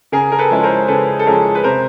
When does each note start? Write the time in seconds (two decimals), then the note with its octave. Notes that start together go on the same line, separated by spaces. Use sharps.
0.12 C#3 G#4 A#4
0.32 A#4
0.39 A4 B4
0.50 F3 G#3 C#4 E4
0.63 A#4 C5
0.88 C#3 A4 B4
1.19 A4
1.26 F3 G#3 C#4 E4 G#4 A#4
1.55 B4
1.64 C3 A#4 C5